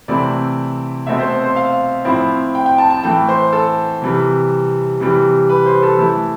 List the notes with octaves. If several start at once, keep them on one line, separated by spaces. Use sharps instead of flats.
C3 E3 A3 C4 E4 D5
B2 A3 C4 E5
C5
C5
F5
A2 F3 C4 E4
G5
G5
A5
A5
A2 E3 A3 G5
C5
A4
C3 E3 G3
C3 E3 G3
B4
C5
A4
E3 A3 E4 A4